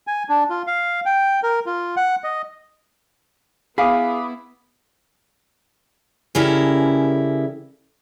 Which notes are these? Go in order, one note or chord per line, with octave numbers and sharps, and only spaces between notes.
G#5
D4
F4
F5
G5
A#4
F4
F#5
D#5
B3 E4 G#4 F5 B5 D6 D#6
C#3 G3 C#4 E4 A4 A#4